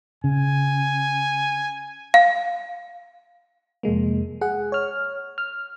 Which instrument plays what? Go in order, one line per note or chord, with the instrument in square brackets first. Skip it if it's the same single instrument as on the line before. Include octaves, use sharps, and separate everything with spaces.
[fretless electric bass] C#3 [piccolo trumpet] G#5
[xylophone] F5
[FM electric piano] F2 C3 G#3 A#3
G#4 F#5
C#5 F6
F6